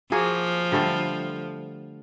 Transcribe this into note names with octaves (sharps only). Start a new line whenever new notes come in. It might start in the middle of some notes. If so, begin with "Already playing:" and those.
F3 A#3 F#4 G#4
D3 G3 A3